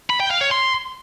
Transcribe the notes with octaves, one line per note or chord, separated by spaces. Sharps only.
B5
G5
F5
C#5
C6